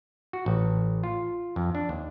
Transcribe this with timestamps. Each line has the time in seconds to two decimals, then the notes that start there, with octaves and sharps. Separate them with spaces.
0.33 F#4
0.46 A1
1.03 F4
1.56 F2
1.75 D4
1.89 D#2